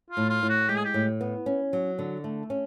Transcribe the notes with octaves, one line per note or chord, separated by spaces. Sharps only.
F4
A2
F4
A2
F#4
G#3 G4
G#4
G4
A2
B3
C#4
F#3
D3
A3
C#4